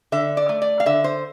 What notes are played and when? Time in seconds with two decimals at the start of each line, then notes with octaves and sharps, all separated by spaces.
0.12 D3 E5
0.37 D5
0.49 A3
0.62 D5
0.80 F5
0.86 D3 E5
1.04 C5